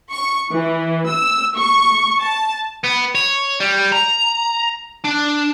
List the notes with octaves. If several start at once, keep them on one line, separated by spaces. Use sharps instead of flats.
C#6
E3
E6
C#6
A5
B3
C#5
G3
A#5
D4